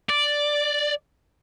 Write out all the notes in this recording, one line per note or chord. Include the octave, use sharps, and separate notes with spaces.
D5